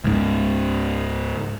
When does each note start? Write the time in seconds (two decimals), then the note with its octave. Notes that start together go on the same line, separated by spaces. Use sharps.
0.04 C#2 G#2